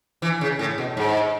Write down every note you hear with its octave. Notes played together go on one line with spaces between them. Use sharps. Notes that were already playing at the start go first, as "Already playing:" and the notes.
E3
C#3
A2
B2
G#2